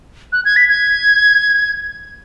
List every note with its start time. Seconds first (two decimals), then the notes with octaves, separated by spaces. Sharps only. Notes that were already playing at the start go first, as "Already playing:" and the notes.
0.32 F#6
0.45 G#6
0.56 B6
0.69 G#6